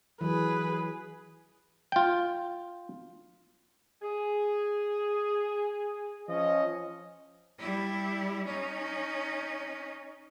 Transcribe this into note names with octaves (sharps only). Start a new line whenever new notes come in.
E3 F#3 G#4 B4
F4 G5
G#4
F3 C#4 D#5
G3 E4
C#4 D#4